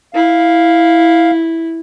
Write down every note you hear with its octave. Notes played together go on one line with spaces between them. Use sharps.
E4 F5